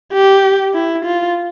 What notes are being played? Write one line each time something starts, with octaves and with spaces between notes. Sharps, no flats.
G4
E4
F4